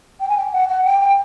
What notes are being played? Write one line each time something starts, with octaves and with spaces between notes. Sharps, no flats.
G5
G#5
G5
F#5
F#5
G5
G5